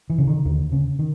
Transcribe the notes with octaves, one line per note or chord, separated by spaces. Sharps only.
E3
C#3
D#3
D#2 D3
C#3
D#3